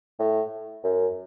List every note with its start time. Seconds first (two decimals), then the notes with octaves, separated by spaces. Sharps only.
0.19 A2
0.84 F#2